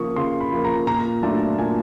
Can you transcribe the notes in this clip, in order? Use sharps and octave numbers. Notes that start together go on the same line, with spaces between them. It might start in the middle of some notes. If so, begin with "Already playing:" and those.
Already playing: C#3 F3 A#3 C#6 D#6
C#3 C6
B5
F3 A#3
A#5
A#2 A#5
F#3 A3 D4 F4 A5
A#2 G#5